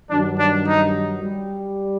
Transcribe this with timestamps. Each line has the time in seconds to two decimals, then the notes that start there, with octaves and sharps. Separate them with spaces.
0.10 G2 D#3 F#3 D4
0.39 D4
0.68 D#4
1.24 G3